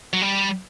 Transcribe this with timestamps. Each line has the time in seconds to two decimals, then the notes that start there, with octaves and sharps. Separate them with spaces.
0.13 F#3
0.22 G3